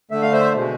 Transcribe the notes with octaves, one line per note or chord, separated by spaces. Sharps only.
D3 A3 E5
F5
C5 E5
B2 G#3